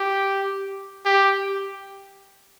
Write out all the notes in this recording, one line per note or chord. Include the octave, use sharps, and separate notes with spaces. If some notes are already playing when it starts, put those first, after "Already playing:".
Already playing: G4
G4